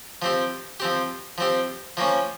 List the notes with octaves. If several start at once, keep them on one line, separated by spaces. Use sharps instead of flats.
F3 C4 G4
F3 C4 G4
F3 C4 G4
F3 A#3 C#4